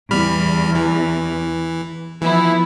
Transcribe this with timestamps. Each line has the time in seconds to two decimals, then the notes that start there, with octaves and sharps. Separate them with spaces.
0.11 E2 G3 B5 F6
0.75 E3
2.22 E3 F3 B3 E4